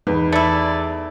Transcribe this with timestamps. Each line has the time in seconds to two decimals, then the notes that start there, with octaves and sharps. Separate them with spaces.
0.07 E2 D#4 B4
0.32 A3 E4 D5